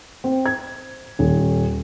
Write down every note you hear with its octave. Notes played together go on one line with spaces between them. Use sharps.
C4
G#6
D#1